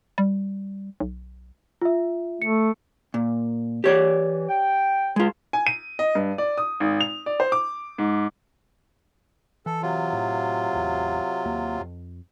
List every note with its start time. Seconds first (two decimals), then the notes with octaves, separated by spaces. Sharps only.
0.18 G3
1.00 B1
1.81 F4 E5
2.42 A3 C#7
3.14 A#2
3.84 E3 G4 C#5 D5
4.49 G5
5.16 G#3 F4
5.53 G#5
5.67 D#7
5.99 D#5
6.15 G2
6.38 D5
6.58 D#6
6.80 G#1
7.01 F7
7.26 D5
7.40 C5
7.52 D6
7.98 G#2
9.66 E3 A4
9.82 C3 F#3 F4
10.13 A2
10.73 A1 E2
11.45 D#2 A#3
11.80 F2